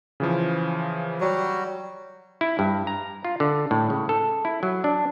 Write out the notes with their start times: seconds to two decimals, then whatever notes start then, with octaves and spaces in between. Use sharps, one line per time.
0.20 C#3 E3 F3
1.21 F#3 G3 F#4
2.41 E4
2.59 G2
2.87 A#5
3.25 F4
3.40 D3
3.71 A2
3.90 C#3
4.09 A4
4.45 E4
4.63 F#3
4.84 D4